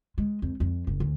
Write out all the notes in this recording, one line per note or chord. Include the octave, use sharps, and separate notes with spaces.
G#3
F2
F2
F#1
D2